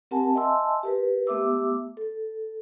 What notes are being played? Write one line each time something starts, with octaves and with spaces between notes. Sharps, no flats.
C4 G4 A#4 F#5 G#5 A5
D#5 E5 G#5 A5 C6 E6
G4 A#4 B4
A3 B3 G4 E5 D6 E6
A4